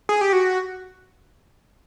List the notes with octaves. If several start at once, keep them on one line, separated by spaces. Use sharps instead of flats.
G#4
G4
F#4